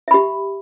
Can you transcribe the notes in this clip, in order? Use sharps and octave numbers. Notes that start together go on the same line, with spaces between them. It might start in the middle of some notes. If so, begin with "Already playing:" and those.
G4 E5 B5